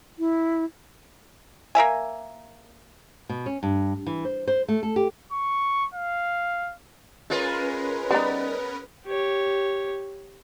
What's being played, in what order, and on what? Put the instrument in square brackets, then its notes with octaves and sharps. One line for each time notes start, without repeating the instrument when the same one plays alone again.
[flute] E4
[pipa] A#3 A#4 E5 G#5
[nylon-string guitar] B2
C#4
G2
E3
C5
C5
A3
A4
G4
[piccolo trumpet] C#6
F5
[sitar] G#3 F4 [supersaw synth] C#4 A#4 B4
[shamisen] G3 D#4 [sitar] B3
[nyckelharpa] G4 C#5